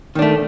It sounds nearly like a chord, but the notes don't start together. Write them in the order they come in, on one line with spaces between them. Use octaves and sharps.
D#3 D4 A3